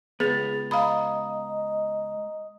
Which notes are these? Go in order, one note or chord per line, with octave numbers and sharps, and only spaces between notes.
C#2 B3 G#4 A6 F7
D#5 F5 A#5 B5 D#6